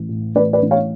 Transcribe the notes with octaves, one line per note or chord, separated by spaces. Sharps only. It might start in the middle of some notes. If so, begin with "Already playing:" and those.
Already playing: A1
A2
A1 B4 D5
B4 D5
A1
C#5 F5